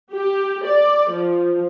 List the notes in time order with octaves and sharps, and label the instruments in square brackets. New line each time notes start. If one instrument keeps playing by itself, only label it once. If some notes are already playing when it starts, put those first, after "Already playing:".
[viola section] G4
D5
F3